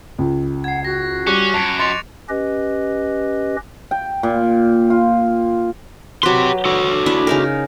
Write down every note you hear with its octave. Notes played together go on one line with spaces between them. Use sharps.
C#2
F#5 G#6 C7
F#4 A#6
G3 C#4 C#6 D6 F#6
F#2 A5 C#7 D7 F7
D#5 C6 A6 C#7 F7
C#4 G4 B4 D#5
G5
A#2
F4
F#3 G4 B4 C6
F#4 A4
D4 E4 E5
C#3 D#4 A#4